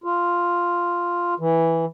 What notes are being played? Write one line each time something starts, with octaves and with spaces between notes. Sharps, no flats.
F4
E3